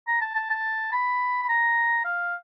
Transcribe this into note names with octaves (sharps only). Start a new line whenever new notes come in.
A#5
A5
A5
A5
B5
B5
A#5
F5